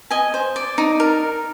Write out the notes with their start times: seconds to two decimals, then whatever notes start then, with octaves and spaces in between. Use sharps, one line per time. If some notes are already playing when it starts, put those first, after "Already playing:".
0.11 D#5 G#5
0.34 C5
0.56 D5
0.78 D#4
1.00 A#4